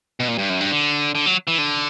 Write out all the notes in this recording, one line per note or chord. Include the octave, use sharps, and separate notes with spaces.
B2
A#2
G2
F#2
G2
D3
D3
F#3
E3
D3